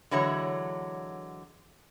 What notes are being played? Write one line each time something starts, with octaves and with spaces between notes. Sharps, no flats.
D3 E3 F#3 G#3 C#5